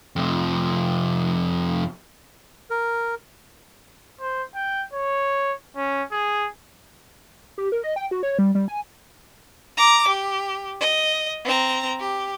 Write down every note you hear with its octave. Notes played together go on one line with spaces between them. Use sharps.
F2 C3
A#4
C5
G5
C#5
C#4
G#4
G4
A#4
D#5
G5
F#4
C#5
G3
G3
G#5
A#5 D6
G4
D#5
C4 A#5
G4